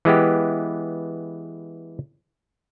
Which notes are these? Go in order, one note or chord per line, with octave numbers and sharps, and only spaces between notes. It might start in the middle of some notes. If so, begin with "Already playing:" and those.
E3 G#3 B3 G4